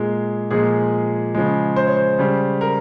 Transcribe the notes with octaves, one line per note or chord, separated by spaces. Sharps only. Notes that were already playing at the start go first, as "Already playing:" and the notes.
Already playing: A#2 G#3 G#4
A#2 F3 G#3 G#4
C#3 F3 G#3
C5
C#5
C5
C#3 G3
A#4